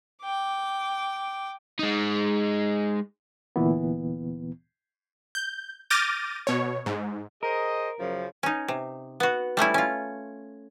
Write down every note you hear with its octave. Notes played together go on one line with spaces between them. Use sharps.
G5 D6
G#3 D#4
D2 A#2 E3 B3
G6
D6 F6 G6 A6 A#6 D#7
B2 C#5
G#2
G#4 A#4 C5 D#5
F#2 C#3 F3
C#4 D#4
C3
B3 F#4
G3 A3 C#4 E4
C#4 F4